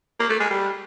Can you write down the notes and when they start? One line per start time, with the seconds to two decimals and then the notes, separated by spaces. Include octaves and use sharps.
0.19 A#3
0.29 A3
0.40 G#3
0.50 G3